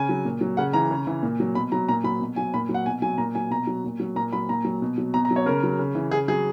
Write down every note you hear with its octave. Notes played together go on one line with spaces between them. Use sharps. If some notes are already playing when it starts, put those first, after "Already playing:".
Already playing: C#3 G#5
F#3
A#2
F#3
C#3 F#5
E3 A#5
C#3
E3
A#2
F#3
B2 B5
F#3 A#5
A#2 A#5
F#3 B5
B2
F#3 G#5
A#2 B5
F#3
F#5
B2 G#5
F#3 G#5
A#2 A#5
F#3 G#5
B2 A#5
F#3
A#2
F#3
A#2 A#5
F#3 B5
A#2 A#5
F#3
B2
F#3
B2 A#5
A#5
F#3
C#5
C#3 A#4
F#3
C#3
E3
C#3 G#4
F#3 G#4